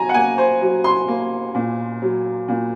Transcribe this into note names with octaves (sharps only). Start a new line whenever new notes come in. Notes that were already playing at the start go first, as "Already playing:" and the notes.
Already playing: F#3 G#5 A#5
F#5
A#3 G#5
C5
F#3
C6
A#3
A#2
F#3
A#2